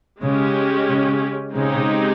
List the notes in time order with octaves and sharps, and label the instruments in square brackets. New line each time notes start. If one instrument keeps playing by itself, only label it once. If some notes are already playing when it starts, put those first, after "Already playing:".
[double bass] C#3 [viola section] G#3 C#4 G4
[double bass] C#3
[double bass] C#3 [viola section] G#3 C4 D#4 G4